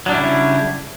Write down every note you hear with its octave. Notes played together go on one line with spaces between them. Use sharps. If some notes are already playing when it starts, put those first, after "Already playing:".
C#3 F#3 G3 D4 E4